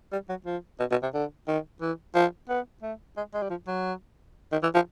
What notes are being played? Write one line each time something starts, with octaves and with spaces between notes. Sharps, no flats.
G3
F#3
F3
B2
B2
C3
D3
D#3
E3
F3
B3
A3
G#3
G#3
G3
F3
F#3
D#3
E3
F3